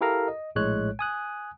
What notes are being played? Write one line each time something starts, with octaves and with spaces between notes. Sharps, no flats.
E4 G4 A4 A#4 F5 A#5
D#5
A#1 A2 G#3 C#5 F#6
G#5 D#6 F#6